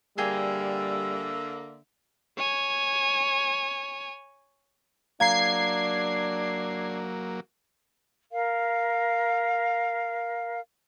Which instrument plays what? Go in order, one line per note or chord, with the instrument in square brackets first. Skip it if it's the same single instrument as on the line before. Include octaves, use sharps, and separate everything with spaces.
[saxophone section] D3 A#3 [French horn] G3 [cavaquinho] G#4 G5 G#5 [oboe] E5
[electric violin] C#5 G#5
[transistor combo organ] F#3 A#3 [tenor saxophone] D4 [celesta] F5 A#5 [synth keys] G#6 C7
[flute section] A#4 F5